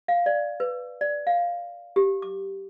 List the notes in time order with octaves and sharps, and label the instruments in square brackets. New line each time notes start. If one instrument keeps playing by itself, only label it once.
[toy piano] F5
D5
B4
D5
F5
G4
D6